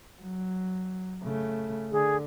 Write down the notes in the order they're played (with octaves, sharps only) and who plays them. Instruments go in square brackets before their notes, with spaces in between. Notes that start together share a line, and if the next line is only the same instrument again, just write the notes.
[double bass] F#3
C#3 A3
[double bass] D3 [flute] G#4